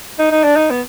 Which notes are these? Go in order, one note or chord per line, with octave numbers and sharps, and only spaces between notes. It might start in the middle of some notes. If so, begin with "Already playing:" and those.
D#4
D#4
D4
D#4
B3